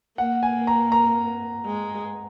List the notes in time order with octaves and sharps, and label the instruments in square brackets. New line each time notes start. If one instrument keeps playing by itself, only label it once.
[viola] A#3 [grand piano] F#5
[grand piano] G#5
A#5
A#5
[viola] G#3